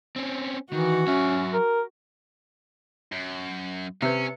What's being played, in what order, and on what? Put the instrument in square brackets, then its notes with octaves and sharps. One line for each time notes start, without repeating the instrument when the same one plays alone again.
[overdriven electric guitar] C4 C#4
[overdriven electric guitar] D#3 [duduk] E3 [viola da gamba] F#4
[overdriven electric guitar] F#3 E5 [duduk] C#4
[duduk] A#4
[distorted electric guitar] F#2
[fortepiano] C3 [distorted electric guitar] C#4 [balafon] B4 E5